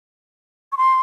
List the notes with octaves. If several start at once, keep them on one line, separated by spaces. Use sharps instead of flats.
C#6
C6